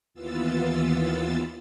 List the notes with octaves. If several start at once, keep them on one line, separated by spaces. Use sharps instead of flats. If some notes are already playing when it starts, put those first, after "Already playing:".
D#2 E3 B3 F4 E6 A6